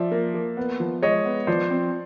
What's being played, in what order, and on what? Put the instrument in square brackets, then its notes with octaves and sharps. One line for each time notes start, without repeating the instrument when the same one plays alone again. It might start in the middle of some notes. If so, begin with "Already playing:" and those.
Already playing: [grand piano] F3 [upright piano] D5 E5
[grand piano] A#3
A#3
B3
F3
[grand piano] G#3 [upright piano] C#5 D#5
[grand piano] B3
[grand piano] F3 [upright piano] C5 D5
[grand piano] C4